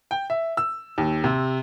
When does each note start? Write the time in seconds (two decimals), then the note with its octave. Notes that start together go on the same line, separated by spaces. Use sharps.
0.11 G5
0.30 E5
0.57 E6
0.98 D#2
1.24 C3